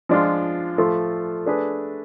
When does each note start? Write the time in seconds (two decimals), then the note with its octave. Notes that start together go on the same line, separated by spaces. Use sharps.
0.09 F3 G#3 D4 F4
0.78 F3 A3 F4 A4
1.46 A3 D4 G#4 B4